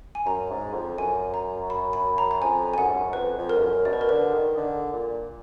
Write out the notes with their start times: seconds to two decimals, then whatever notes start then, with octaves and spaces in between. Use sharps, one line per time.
0.15 G#5
0.26 F#2 A#5
0.50 G#2
0.74 F2
0.97 F#2 G#5
1.34 A#5
1.70 B5
1.93 B5
2.18 A#5
2.31 A#5
2.42 F2 G#5
2.74 G#5
2.77 F#2 F#5
2.87 G#2
2.95 F#2
3.13 F2 B4
3.38 F2
3.49 A#4
3.57 G#2
3.61 F#2
3.85 B2 D5
3.93 B4
4.01 A#4
4.09 D3 B4
4.34 D#3
4.57 D3
4.93 A#2